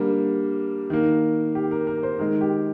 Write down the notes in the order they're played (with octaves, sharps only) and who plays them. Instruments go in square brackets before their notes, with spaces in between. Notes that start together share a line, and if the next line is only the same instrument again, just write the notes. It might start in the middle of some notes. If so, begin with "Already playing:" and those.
Already playing: [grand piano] D3 G3 A#3
D#3 A#3
G4
A#4
A#4
C5
D#3 G#3 A#4
G4